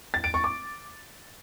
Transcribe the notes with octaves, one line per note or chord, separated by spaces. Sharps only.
A6
D7
C#6
D6